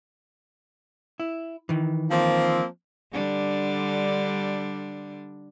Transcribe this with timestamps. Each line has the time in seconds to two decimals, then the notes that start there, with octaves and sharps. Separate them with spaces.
1.20 E4
1.69 D#3 E3
2.11 F3 A#3 C4
3.12 D3 G3 D4